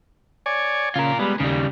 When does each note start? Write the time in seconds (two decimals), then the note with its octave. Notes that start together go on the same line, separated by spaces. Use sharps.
0.46 C#5 D5 G#5
0.96 C#3 F4 A#4
1.19 G3 G#3 B3
1.40 D#2 C#3 G3